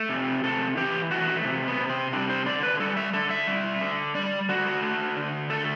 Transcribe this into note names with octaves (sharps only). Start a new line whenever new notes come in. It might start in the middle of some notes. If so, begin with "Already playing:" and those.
Already playing: A3
C3
C3 A4
E3 G4
A3 F#4
C3
B3
C3
C4
G3 D4
C5
D3 D5
B4
G3 A4
E5
D3 A4
E5
G3
D3
G3 D5
D3 F#4
A3
D3
A3 A4